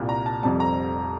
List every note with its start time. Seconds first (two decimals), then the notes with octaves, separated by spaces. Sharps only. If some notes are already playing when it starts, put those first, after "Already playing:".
Already playing: C2 A#2 G3
0.09 A#5
0.26 A5
0.42 F1 F2 C3 G3 A5
0.60 A#5